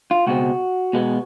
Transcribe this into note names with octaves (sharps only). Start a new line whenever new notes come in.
F4
C#2 B2 G#3 C4 F#4
B2 G#3 B3